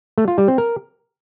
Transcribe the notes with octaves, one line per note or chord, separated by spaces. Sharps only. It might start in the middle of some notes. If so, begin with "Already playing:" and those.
A3
F4
G3
C4
A#4